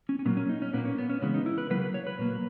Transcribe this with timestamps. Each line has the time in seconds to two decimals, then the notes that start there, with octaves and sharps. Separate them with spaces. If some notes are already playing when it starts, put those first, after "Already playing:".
0.09 C#4
0.19 C#4
0.25 A#2 F#3 A#3 B3
0.37 C#4
0.49 D#4
0.62 C#4
0.73 A#2 A#3 B3
0.85 C#4
0.98 B3
1.10 C#4
1.22 C#3 E3 G#3 B3 C#4
1.34 D#4
1.46 E4
1.58 B4
1.70 C#3 F#3 A#3 B4
1.82 B4
1.94 C#5
2.07 B4
2.19 A#2 F#3 A#3